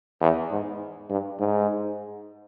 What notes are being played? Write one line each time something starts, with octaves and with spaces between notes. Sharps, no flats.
E2
G#2
G2
G#2